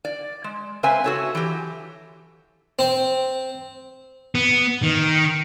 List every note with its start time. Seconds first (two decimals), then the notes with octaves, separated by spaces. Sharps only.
0.05 D5
0.44 G#3
0.83 C#3 C4 B4 E5 G#5
1.04 F#4 A4 C#5
1.35 E3 F#3 G4
2.79 C4
4.35 B3
4.83 D#3